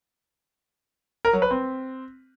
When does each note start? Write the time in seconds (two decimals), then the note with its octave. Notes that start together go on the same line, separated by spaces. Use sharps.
1.25 A#4
1.33 F#3
1.42 B4
1.51 C4